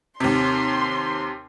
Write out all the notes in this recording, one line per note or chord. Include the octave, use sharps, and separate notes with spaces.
D#2 C3 C6